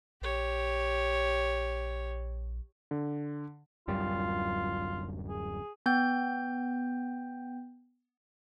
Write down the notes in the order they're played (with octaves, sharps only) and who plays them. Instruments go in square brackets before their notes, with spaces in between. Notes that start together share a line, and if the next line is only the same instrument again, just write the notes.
[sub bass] A#1 [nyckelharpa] G4 C#5
[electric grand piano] D3
[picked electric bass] D1 F#2 G3 [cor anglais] F4
[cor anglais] G#4
[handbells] B3 G5 G6